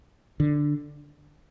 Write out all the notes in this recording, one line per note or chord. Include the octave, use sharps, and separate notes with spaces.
D3